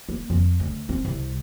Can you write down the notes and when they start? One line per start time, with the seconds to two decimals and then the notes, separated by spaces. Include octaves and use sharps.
0.09 A#3
0.30 F2
0.60 D2
0.89 C4
1.05 C2